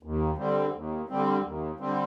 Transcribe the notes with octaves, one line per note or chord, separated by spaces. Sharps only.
D#2
D3 G3 C4
D#2
D3 G3 C4
D#2
D3 G3 C4